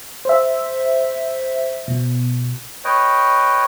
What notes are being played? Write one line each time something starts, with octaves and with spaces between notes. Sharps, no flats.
C5 E5
B2
B4 C#5 D#5 G5